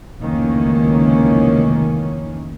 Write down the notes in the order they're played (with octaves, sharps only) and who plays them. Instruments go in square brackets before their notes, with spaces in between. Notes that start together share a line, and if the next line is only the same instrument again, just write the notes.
[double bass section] F1 C#2 D#3 E3 A#3 C#4